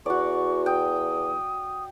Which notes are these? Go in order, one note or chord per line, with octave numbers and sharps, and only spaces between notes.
E2 F#4 D5 C#6
G5 D#6